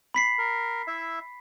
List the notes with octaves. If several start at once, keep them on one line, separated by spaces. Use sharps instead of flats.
B5 B6 C7
A#4
E4 E5